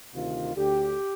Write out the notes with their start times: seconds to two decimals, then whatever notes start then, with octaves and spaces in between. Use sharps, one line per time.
0.14 D2 C3 D#3 F4
0.55 D2 D3 G4